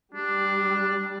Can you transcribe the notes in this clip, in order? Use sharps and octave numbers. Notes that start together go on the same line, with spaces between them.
G3 D4